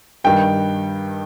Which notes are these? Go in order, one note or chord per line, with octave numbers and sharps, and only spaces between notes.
G2 D#3 G3 G5